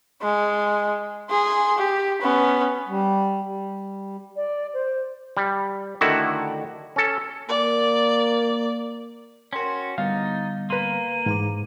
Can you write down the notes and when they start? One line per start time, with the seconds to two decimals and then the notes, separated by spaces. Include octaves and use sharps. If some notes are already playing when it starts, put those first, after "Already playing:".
0.22 G#3
1.30 G#4 C6
1.78 G4
2.22 B3 C#4
2.87 G3
3.44 G3
4.36 D5
4.73 C5
5.37 G3
6.01 D3 D#3 A3 E4 F#4
6.96 C#4 A4
7.48 A#3 D5
9.53 C#4 F#4 A#4 G5 C6
9.98 D3 G3 B3 D#4 F5 A6
10.70 A#3 B4 C6 D#7
11.26 G#2 E3 A#5 D6